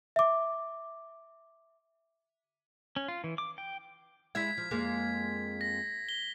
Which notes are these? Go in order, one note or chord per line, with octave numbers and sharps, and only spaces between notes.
E5 D6
C#4
F4
E3
D6
G5
G#3 E4 E5 G#6 B6
F3
F2 G#3 A#3
A#6
G7